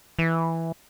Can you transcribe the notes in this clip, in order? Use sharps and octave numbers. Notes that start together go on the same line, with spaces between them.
E3